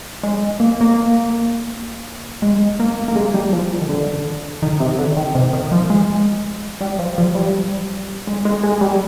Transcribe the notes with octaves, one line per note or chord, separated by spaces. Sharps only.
G#3
A#3
A#3
G#3
A#3
A#3
G#3
G3
F3
D#3
D3
D#3
C3
D3
D#3
C3
D#3
F3
G#3
G3
F3
F3
G3
G#3
G#3
G#3
G3